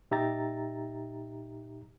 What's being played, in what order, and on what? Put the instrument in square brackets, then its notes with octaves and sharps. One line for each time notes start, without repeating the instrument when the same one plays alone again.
[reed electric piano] A#2 D#4 G4 E5 A#5 A6